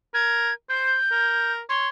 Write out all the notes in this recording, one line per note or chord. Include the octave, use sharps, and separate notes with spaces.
A#4 G#6
C5 G6
A#4
C#5 C6